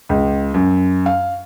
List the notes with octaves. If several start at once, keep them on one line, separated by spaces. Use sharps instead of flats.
C#2
F#2
F5